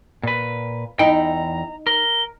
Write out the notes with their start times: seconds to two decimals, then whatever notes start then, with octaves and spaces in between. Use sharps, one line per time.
0.23 A#2 B4
0.99 E2 D#4 E4 G5 A#5
1.87 A#4 G7